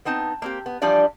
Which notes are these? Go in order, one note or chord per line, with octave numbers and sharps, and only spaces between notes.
B3 C4 D#4 A5
A#3 C4 G4
B3
E3 F3 G3 D4 D5